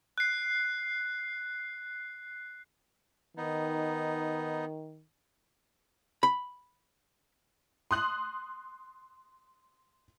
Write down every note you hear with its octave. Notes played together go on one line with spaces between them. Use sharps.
F#6 C7
D#3 B3 D#4
B5
C6 D#6 F#6 F#7